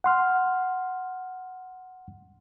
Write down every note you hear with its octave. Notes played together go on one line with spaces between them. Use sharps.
F#5 C6 F6